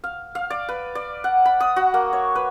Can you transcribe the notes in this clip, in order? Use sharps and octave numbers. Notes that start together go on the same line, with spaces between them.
F5
F5
D5
B4
D5
F#5
B5
D#6
F#4
A#3
C#5
B4